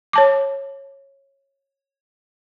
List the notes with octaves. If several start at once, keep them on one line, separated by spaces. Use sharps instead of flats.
C#5 A5 D6